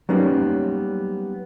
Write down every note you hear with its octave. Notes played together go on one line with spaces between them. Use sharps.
F#3 G3 A#3 B3 C#4 D#4